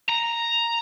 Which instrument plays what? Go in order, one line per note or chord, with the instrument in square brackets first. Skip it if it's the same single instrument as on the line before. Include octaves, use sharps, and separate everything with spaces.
[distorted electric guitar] A#5